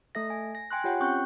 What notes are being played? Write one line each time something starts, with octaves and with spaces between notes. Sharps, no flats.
A3 A4 E5 A#6
G#5
A#6
G5 G#5 C6 F#6
F4 G4 C#5 F#5 G5
C4 C#4 G5 C#6 F#6 G6